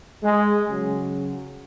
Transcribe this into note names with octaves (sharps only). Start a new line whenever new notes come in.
G#3
C#3 F#3